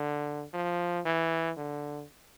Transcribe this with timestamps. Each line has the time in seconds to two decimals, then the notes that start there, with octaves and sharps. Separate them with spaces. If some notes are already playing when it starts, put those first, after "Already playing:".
Already playing: D3
0.53 F3
1.05 E3
1.57 D3